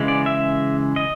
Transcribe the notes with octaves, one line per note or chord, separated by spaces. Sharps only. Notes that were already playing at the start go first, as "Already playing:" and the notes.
Already playing: C#3 E3 G#3
D5
E5
D#5